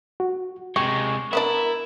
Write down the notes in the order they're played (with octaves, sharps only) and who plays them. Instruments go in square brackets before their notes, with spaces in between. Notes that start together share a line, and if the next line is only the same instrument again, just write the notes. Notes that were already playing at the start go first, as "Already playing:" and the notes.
[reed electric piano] F#4
[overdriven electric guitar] C3 G#3 [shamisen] G4 [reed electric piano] C#6
[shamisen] B3 C#4 D4 [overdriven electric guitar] E4 [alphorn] A#4